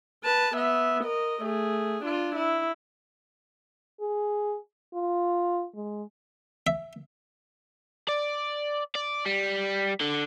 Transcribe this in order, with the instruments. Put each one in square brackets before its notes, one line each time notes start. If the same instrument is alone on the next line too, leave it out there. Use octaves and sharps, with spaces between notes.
[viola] B4 A5
B3 E5
A#4 D#5
A3 G#4
D4 F4
E4
[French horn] G#4
F4
G#3
[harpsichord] E5
[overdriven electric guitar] D5
D5
G3
D3